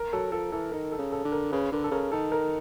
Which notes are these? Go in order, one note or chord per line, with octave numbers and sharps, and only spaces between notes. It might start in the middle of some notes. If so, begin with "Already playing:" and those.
Already playing: A#4
F#3 A4
F3 A4
E3 A4
D#3 A#4
A4
C#3
A4
D3
A#4
C#3 B4
D3 A#4
A4
C#3 A#4
D#3 A4
A#4